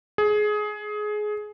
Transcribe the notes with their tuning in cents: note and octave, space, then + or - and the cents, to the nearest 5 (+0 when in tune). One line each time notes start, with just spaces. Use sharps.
G#4 +20